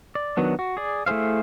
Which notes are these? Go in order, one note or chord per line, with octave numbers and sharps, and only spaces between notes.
D5
D#3 F#3 B3 D4
F#4
G#4 D5
A3 E4 G#4 C5 F5